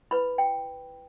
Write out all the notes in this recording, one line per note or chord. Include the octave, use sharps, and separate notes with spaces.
E4 B4 B5
G5